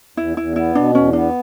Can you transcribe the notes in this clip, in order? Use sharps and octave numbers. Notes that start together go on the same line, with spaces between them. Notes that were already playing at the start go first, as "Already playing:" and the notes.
E2 E4
E2 E4
B3 E4
B2 D4
E2 C#4
B3 D4